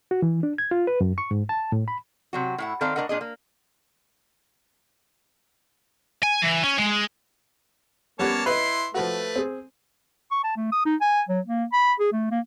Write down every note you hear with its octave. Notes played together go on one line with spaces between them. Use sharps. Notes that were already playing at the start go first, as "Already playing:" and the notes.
F#4
E3
D4
G#6
F4
B4
F#2
C#6
G#2
A5
A2
B5
C3 F#3 F#4
A2 E4 F#5
D#3 C4 A4 D5 F5 A#5
A2 B3 D4 A#4 D#5 F#5
A#2 D4 G#4 D#5
A#3
G#5
E3
C#4
G#3
G3 A#3 B3 C#4 C#5 A5
E4 B4 D#5 C6
F3 A3 F#4 B4
C4 G#4
C#6
A5
A3
D#6
D#4
G#5
F#3
A#3
B5
G#4
A3
A#3